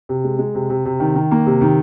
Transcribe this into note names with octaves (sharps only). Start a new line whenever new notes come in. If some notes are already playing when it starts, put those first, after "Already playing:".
C3
G#3
G#3
C3
C3
C3
D#3
D#3
A#3
C3
D#3